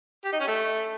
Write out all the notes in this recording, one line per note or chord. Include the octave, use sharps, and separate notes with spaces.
G4
D#4
C#4
A3